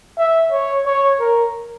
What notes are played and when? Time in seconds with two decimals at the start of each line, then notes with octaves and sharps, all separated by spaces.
0.18 E5
0.52 C#5
0.86 C#5
1.20 A#4